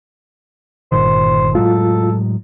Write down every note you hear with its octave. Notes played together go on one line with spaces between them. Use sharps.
G1 A#2 D#3 C5
A2 F#3 G#3 F4 A4